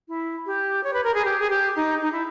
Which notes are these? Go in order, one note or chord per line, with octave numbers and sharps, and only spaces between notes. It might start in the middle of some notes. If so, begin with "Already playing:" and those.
E4
G4
C#5
B4
A#4
G#4
G4
G#4
G4
D#4
D#4
E4